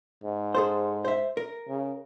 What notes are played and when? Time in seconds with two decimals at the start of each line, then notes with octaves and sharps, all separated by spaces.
0.24 G#2
0.55 G#4 A4 C5
1.05 C5 E5
1.37 A#4
1.68 C#3